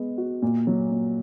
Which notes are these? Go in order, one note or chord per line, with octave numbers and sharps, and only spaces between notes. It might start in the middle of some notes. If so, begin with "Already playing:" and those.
Already playing: G#3 B3
F#4
A#2
F#3
A#2